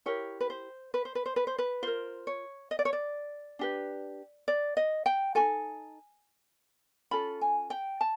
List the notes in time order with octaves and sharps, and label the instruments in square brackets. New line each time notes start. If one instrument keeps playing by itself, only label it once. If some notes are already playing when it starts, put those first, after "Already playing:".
[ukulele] E4 G4 A#4 C#5
B4
C5
B4
C5
B4
C5
B4
C5
B4
F4 A#4 C5
C#5
D#5
D5
C#5
D5
D4 G4 B4
D5
D#5
G5
F#4 A4 G#5
D#4
C#4 F4 A4 B5
G#5
G5
A5